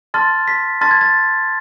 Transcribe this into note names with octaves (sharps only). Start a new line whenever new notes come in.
A5 C6 F6 A6
B6
A5 C6 F6 A6
G#6
A6